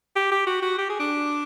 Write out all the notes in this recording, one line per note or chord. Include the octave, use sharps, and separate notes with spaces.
G4
G4
F#4
F#4
G4
G#4
D4